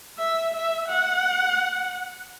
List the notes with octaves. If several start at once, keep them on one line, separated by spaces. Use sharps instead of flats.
E5
E5
F#5